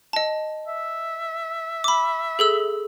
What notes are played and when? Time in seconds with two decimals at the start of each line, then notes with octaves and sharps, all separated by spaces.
0.13 D#5 A5
0.68 E5
1.84 B5 D6
2.39 G#4 A4 E6